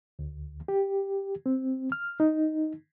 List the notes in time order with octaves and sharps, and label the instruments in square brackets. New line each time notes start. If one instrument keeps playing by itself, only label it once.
[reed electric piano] D2
G4
C4
F6
D#4